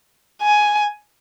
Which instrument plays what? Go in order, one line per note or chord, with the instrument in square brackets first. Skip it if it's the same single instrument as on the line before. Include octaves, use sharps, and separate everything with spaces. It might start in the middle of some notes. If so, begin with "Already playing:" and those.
[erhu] G#5